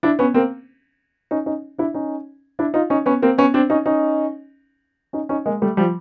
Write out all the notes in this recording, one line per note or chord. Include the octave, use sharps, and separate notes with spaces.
D4 E4
B3 C#4
A#3 C4
C#4 D#4
C#4 D#4
D4 E4
C#4 D#4
D4 E4
D#4 F4
C#4 D#4
B3 C#4
A#3 C4
B3 C#4
C4 D4
C#4 D#4
C#4 D#4
C#4 D#4
C#4 D#4
G#3 A#3
G3 A3
F3 G3